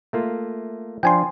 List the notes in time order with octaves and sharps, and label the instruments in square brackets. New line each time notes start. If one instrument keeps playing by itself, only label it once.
[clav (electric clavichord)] A3 A#3 F4
[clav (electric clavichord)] F3 D4 [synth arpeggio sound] G5 G#5 C6